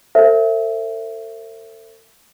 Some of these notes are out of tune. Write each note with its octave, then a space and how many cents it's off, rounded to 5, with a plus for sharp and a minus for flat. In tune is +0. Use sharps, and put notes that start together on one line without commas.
A4 +40 C5 +20 E5 +15